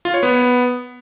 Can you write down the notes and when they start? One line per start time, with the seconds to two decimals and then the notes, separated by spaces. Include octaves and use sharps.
0.05 F4
0.14 C#5
0.23 B3